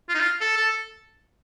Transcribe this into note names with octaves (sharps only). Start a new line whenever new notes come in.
F4
D#4
F4
A4
A4